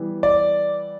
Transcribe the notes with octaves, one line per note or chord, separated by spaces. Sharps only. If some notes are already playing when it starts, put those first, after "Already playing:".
Already playing: E3 G3 B3
D5